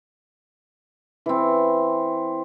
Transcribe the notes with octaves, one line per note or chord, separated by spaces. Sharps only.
E3 C4